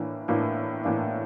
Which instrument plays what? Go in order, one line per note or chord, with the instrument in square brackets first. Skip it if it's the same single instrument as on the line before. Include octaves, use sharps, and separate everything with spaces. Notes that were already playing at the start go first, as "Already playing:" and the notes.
Already playing: [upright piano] A2 E3 A#3 D4
A2 E3 A#3 D4
A2 E3 A#3 D4